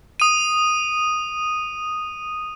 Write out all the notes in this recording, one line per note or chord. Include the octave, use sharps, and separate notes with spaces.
D#6 D#7